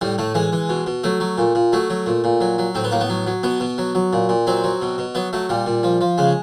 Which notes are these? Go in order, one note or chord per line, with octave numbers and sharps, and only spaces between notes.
A2 G3
A2 A3
E3 G#3
E3
B2
B2
F#3 A3
F#3
A#2
A#2
F#3 A3
F#3
A#2
A#2
F#3
F#3
A2 C4
B3
A2 A#3
B3
F#3
F#3
B2 B3
B2
F#3
F#3
A#2
A#2
F#3 C4
F#3
B2
B2
F#3 B3
F#3 A3
A#2 G3
A#2
F3
F3
C#3 G#3